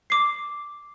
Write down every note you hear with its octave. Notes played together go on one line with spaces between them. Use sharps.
D6 C7